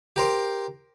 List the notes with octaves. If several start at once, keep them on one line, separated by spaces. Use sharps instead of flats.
G4 A#4 C5